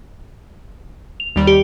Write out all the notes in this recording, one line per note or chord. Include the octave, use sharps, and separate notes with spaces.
F7
D#2 G3
G4